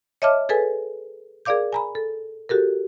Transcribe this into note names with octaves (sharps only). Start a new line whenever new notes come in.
C#5 D#5 E5 A5 D6 F6
G#4 A4 B4 G#5
G#4 A#4 D5 F5 D6 G6
G#5 A#5 B5
A4
F#4 G4 A4 A#4